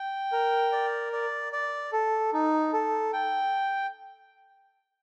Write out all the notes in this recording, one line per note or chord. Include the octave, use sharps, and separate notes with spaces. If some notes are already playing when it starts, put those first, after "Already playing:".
Already playing: G5
A#4
D5
D5
D5
A4
D#4
A4
G5